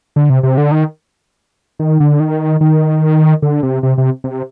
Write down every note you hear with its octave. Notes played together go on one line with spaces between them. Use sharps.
D3
C3
C3
D3
D#3
D#3
D3
D#3
D#3
D3
C3
C3
C3
C3